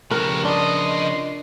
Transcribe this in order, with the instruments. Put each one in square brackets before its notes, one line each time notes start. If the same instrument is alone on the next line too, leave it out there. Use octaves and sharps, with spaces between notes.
[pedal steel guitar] C#3 F3 B4 [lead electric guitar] A3 G4 [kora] A#4
[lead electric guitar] A2 D#5 [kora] D4 [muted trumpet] C6